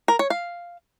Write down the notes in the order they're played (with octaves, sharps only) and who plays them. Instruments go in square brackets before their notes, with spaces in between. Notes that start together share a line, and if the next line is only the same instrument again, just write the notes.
[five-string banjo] A#4
C#5
F5